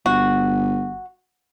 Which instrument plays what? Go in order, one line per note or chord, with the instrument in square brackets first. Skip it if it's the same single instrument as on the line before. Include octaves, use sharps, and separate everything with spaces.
[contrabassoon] G1 [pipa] F#4